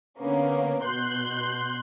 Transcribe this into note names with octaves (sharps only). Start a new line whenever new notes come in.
D3 A#3 B3 C#4
B2 C6 F#6 G6